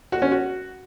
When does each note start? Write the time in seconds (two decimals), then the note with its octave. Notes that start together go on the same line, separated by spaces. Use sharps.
0.12 F#4
0.22 C#4
0.31 F#4